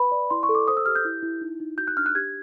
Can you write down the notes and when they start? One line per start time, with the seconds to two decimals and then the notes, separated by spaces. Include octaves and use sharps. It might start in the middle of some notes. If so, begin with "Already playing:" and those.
Already playing: B4 B5
0.12 D5
0.30 E4 C6
0.43 C#6
0.49 A4
0.55 D6
0.68 C5 D#6
0.77 E6
0.86 G4 F6
0.95 G6
1.05 E4
1.22 E4
1.41 D#4
1.60 D#4
1.78 F#4 G6
1.88 F#6
1.97 D4 F6
2.06 F#6
2.15 G4 G#6